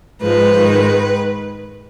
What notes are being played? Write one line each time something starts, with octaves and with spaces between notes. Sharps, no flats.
G#2 F3 G#3 B4
G#2 D#3 G#3